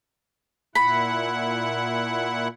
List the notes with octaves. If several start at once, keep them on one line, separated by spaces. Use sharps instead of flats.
A#2 E4 F#5 B5